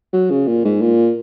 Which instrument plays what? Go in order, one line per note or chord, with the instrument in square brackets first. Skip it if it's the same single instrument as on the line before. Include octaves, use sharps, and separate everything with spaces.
[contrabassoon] F#3
C#3
A#2
G#2
A#2